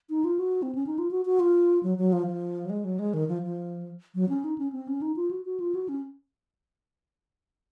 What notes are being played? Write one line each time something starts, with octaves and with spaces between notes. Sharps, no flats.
D#4
F4
F#4
C4
C#4
D#4
F4
F#4
F#4
F4
F#3
F#3
F3
F3
F#3
G#3
F#3
G#3
D#3
F3
F3
F#3
C#4
D#4
C#4
C4
C#4
D#4
F4
F#4
F#4
F4
F#4
C#4